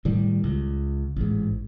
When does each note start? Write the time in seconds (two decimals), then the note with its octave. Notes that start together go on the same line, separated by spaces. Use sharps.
0.05 A2 D#3 G3
0.44 C#2
1.16 A1 G#2